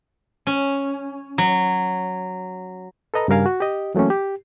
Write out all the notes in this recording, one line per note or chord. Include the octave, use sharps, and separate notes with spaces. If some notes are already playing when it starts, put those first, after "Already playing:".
C#4
F#3
A4 B4 D#5 A#5
G2 C#3 G3 A#4 F5 G#5
F#4
G4 D#5
E3 F#3 A3 A#3 C#4
G4